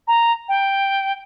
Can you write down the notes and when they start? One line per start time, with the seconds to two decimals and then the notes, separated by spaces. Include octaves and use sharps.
0.08 A#5
0.49 G5